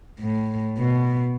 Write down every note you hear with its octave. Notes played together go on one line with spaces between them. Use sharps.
A2
B2